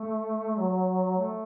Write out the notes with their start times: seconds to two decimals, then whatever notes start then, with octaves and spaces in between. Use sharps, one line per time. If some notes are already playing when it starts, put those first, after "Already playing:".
Already playing: A3
0.57 F#3
1.18 A3